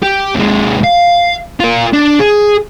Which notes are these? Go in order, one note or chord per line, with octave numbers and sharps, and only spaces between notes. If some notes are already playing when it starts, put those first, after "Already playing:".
G4
D#2 G#3
F5
F4 A#4
D4
G#4